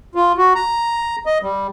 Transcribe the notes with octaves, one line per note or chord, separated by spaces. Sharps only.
F4
F#4
A#5
D#5
G3